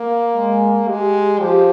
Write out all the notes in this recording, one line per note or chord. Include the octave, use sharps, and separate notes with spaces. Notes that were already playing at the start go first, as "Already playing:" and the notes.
Already playing: A#3
G#3
G#3 G4
F3 G4